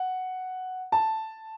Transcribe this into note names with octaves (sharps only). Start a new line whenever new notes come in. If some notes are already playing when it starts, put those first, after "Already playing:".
Already playing: F#5
A5